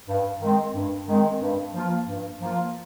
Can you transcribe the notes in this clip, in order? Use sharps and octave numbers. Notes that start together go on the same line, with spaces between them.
G2
D#3 G#3 C4
G2
D#3 G#3 C4
G2
F3 A#3 F4
G2
F3 A#3 F4